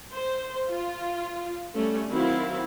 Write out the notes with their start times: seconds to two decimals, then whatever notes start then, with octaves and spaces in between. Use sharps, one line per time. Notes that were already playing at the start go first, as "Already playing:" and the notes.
0.15 C5
0.70 F4
1.73 G3 A3 C#4
2.10 D#3 F#3 C4 E4 F#4 F5